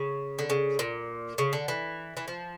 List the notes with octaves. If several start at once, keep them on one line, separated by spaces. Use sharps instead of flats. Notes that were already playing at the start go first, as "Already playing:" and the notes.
Already playing: C#3
D3
C#3
A#2
C#3
D3
E3
E3
F3